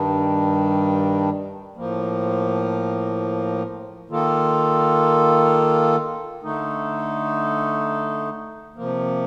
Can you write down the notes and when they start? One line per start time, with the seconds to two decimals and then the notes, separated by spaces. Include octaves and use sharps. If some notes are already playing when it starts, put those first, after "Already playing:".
Already playing: G2 D#3 G3 D4
1.76 A2 F3 A#3
4.10 D#3 A#3 F4 A4
6.43 D3 A3 D#4
8.76 C3 F3 A#3